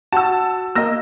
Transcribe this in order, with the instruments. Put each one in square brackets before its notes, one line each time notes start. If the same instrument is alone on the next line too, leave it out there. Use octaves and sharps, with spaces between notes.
[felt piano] F#4 [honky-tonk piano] A5 E6
[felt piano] A#3 D#5 [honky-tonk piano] E6 A#6